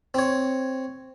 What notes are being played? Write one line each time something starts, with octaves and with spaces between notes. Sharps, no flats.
C4 C#5